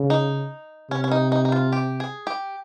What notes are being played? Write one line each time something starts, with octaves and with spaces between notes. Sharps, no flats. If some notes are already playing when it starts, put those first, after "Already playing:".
Already playing: C#3
D#4
C3 C#4
C#4
D#4
D#4
D#4
F4
G4
G#4
G4